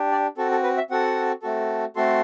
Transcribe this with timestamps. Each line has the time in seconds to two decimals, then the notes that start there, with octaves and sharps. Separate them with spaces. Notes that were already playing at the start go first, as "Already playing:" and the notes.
Already playing: D4 G4
0.12 D5
0.37 C4 F#4 A4
0.51 A4
0.63 B4
0.77 E5
0.90 C4 F#4 A4 F#5
1.42 A3 C4 F#4 A4
1.96 A3 C4 F#4 A4 C6